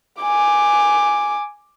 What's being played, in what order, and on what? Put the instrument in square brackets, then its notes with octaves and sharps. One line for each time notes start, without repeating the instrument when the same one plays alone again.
[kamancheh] G#5 D6